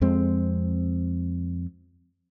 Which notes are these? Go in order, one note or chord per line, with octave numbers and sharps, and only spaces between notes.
F2 G#3 C4